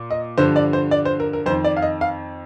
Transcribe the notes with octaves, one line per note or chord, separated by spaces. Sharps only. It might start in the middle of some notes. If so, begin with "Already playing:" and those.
Already playing: A#2
D#5
G2 D3 F3 C5
D5
C5
D5
C5
A#4
A#4
F2 D#3 C5
D5
F5
D#5
F5